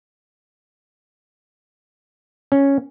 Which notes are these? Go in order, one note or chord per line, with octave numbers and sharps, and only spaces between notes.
C#4